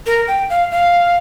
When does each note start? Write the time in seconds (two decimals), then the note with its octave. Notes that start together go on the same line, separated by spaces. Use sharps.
0.06 A#4
0.28 G5
0.50 F5
0.71 F5